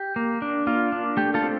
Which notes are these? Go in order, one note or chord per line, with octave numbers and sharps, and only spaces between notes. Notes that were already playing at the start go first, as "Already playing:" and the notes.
Already playing: G4
A#3
D4
A#3 F4
D4
A3 G4
F4 A4
C4